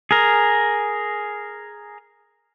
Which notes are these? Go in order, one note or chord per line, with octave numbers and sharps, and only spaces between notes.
G#4 A#4